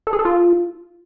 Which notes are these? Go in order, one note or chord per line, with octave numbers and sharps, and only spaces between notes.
A4
G#4
A4
F4